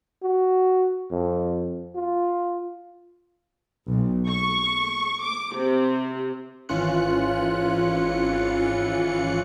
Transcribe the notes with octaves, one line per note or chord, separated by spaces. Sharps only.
F#4
F2
F4
B1
C#6
D6
C3
G#1 E3 C#4 F4 F#6 C#7